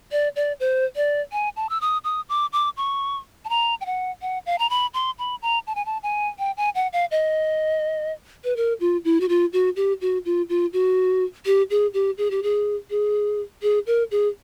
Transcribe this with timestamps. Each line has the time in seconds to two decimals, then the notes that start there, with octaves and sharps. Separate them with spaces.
0.12 D5
0.36 D5
0.60 C5
0.96 D5
1.32 G#5
1.56 A5
1.70 E6
1.81 D#6
2.04 D#6
2.29 D6
2.53 D6
2.77 C#6
3.45 A5
3.49 A#5
3.81 G5
3.86 F#5
4.22 F#5
4.46 F5
4.59 A#5
4.70 B5
4.94 C6
5.19 B5
5.42 A#5
5.67 A5
5.75 G#5
5.86 A5
6.03 G#5
6.39 G5
6.57 G#5
6.75 F#5
6.93 F5
7.11 D#5
8.44 B4
8.56 A#4
8.80 F4
9.05 E4
9.20 F#4
9.29 F4
9.53 F#4
9.76 G4
10.01 F#4
10.25 F4
10.49 F4
10.73 F#4
11.46 G4
11.70 G#4
11.94 G4
12.18 G#4
12.31 G4
12.43 G#4
12.90 G#4
13.62 G#4
13.87 A#4
14.11 G#4